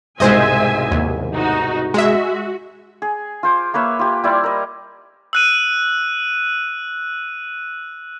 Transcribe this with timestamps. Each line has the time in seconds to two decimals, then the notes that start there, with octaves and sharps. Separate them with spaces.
0.20 C2 G#2 B2 G#3 C5 D#5 E5 G#5
0.91 D#2
1.35 D#4 F#4
1.94 G#3 F#4 E5
3.02 G#4
3.43 F4 C5 D6
3.74 A#3 B4 C#5 E5
3.99 F4 G4
4.24 G3 E4 C5 D5
4.44 A#4 D#5
5.33 E6 F#6 D#7